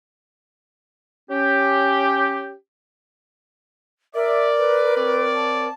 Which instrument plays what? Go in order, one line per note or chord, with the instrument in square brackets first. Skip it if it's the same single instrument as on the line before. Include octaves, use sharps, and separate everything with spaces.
[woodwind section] C#4 G4
[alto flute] A#4 [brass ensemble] D5 [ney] E5
[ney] B4
[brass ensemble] C4 C#5 D5
[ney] A5